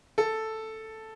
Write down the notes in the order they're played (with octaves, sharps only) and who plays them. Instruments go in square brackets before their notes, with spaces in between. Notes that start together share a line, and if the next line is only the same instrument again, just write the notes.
[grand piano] A4